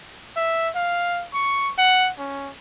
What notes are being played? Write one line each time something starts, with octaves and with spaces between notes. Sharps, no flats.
E5
F5
C#6
F#5
C#4